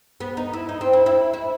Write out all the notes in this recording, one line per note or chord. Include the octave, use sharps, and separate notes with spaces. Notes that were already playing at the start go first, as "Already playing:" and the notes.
B3
D#4
E4
D#4
C4
E4
E4
E4